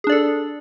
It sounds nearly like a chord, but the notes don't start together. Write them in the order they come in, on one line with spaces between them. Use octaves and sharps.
G#4 D4 D5 A4